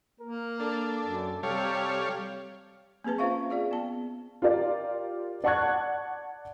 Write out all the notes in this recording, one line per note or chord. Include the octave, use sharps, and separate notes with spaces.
A#3 A#4
D4 A4
F#2
C3 G3 A4 C#5 F5
A#3 C4 G#4 B4 A5
C#4 F4 C5 E5 F5 C#6
F4 G#4 D5 F5
B3 A5
F4 G4 A#4 D5
D5 F#5 A5 C#6 F#6 G#6